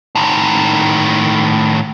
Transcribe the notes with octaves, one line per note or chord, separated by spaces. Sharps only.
A2 D#3